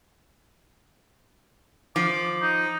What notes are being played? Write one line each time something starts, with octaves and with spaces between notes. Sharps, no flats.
F3 D6
D#4